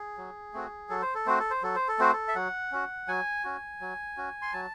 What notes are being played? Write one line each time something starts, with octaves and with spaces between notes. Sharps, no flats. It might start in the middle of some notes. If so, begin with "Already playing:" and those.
Already playing: G#4
F#3
A3 C4 F#4
F#3 A4
C5
A4
A3 C4 F#4 C5
A4
C5
F#3 A4
C5
A4
A3 C4 F#4 C5
A4
E5
F#3 F#5
C#4 F#4
F#3 G#5
C#4 F#4
F#3
C#4 F#4
C6
F#3 A5